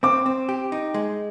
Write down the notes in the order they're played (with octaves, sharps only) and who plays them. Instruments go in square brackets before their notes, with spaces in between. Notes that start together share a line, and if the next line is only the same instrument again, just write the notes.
[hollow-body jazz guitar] C4 [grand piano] D6
[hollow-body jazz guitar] C4
G4
D#4
G#3